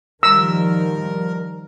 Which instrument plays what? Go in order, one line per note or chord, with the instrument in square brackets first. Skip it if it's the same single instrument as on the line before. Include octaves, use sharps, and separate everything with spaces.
[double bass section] D#3 F3 G3 [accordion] A#4 [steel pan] E6